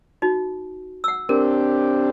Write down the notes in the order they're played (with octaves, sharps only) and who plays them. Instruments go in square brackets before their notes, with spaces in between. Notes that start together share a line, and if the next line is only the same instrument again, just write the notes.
[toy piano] D#4 F#4
F#5 E6
[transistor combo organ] C4 D4 G4 [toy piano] A#4